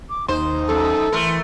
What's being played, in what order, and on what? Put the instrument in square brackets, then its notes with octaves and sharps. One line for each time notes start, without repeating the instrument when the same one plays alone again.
[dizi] D6
[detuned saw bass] D#2 [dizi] D#4 [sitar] C5
[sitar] F#2 [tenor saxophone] A4
[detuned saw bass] E3 [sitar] A3 A#4 [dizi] C6